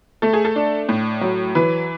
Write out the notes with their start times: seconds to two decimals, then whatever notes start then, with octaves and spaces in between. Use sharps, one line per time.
0.22 A3 A4
0.33 G#4
0.45 A4
0.56 D4
0.89 A2
1.21 F#3
1.55 E3 B4